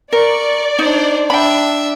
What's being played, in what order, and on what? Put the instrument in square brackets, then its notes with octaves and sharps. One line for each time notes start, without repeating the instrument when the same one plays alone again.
[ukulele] A#4 [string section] D5 [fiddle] C#6
[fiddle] D4 C5 [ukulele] D#4
[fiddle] D4 E5 [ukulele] G5 B5